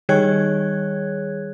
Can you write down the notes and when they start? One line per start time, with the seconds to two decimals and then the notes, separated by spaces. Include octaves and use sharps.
0.09 D#3 G3 G#4 C#5 F#6 G#6